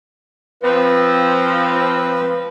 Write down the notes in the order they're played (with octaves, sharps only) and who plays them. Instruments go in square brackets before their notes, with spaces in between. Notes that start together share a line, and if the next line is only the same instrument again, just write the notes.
[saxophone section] F3 C4 [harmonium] B4